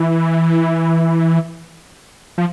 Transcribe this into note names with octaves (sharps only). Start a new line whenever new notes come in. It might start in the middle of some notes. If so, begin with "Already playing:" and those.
Already playing: E3
F3